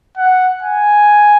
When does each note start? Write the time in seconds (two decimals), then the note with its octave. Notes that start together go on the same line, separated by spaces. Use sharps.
0.17 F#5
0.63 G#5